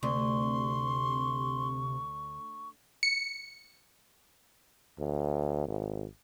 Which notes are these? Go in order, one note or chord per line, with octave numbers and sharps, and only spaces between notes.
D2 C3 C6 C#6
C#7
D2
G#1